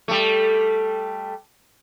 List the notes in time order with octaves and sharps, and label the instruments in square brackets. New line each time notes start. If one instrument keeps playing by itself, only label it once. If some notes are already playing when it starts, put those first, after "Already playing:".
[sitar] G3 A3